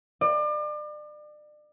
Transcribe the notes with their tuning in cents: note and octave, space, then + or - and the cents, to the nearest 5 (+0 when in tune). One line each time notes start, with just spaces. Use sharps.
D5 +35